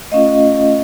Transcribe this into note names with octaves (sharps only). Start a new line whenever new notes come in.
A3 C#4 F4 D#5 F5